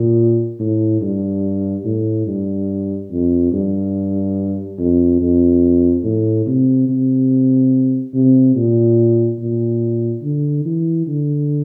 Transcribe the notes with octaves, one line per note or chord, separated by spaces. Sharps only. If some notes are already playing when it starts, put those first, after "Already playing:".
Already playing: A#2
A2
G2
A2
G2
F2
G2
F2
F2
A2
C3
C3
C3
A#2
A#2
D3
E3
D3